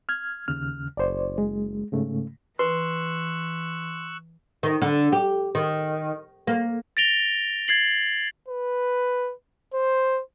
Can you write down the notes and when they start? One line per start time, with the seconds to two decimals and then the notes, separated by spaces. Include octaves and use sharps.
0.09 F6 G#6
0.48 D#2 C#3 F6
0.97 F#1 C5 D5
1.38 G#3
1.92 G#2 C#3 A3
2.59 E3 B4 C6 C#6 E6 F#6
4.63 D#3
4.82 D3
5.12 G4
5.55 D#3
6.47 A#3
6.97 A6 A#6 D7 F7 G7
7.68 G#6 A6 C7 F#7
8.48 B4
9.73 C5